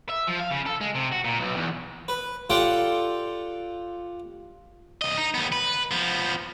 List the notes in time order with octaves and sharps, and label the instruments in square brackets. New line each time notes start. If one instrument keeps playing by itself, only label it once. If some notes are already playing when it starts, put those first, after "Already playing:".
[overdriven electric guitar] E5
F3
F5
C#3
A4
G#3
C3
F#4
A#2
B1
E2
[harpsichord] B4
F4 G4 A4 D5 F#5 G5
[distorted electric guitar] C2 D#5
D#4
D#2 B3
B4
F3 B3